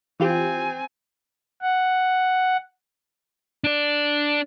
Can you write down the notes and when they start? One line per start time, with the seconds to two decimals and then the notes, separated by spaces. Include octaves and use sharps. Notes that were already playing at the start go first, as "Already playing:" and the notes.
0.20 E3 C4 F4 G4 G#5
1.62 F#5
3.64 D4 D5